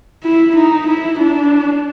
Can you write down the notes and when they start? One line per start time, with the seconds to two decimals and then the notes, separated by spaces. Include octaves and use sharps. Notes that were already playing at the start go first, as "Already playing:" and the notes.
0.24 E4
0.56 D#4
0.87 E4
1.19 D4